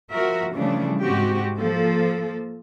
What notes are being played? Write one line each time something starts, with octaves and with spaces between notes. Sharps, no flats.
F3 F#4 A#4 E5
C#3 E3 F3 G3 A3 D4
G#2 C3 G#3 C4 F#4 G4
F3 A#3 A4